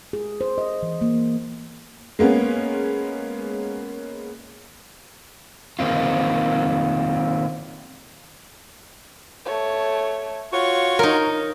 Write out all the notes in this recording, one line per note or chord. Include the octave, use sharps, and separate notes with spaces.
G#4
C5
D#5
E3
A#3
G#3 A#3 B3 C#4
D#3 A#3 C4 F4
A3 C#5
F4 F#4 C#5 C#6
D#4 A#4